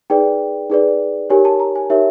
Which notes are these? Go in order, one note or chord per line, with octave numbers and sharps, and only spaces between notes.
D#4 G#4 B4 D5 G5
D#4 G#4 B4 D5
D#4 G4 A#4 C#5 G#5
A5
A#5
G#5
D#4 G4 A#4 C#5 E5